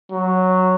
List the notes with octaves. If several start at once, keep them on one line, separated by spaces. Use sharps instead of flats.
F#3